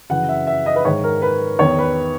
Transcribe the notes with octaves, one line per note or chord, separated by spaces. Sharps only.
F#2 C#3 E3 F#5
E5
E5
D#5
B4
G#2 D#3 C#5
A#4
B4
E2 D#3 C#5
B4